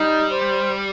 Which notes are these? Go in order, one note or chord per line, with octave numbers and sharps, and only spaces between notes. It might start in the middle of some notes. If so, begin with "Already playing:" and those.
Already playing: G3 D#4
C5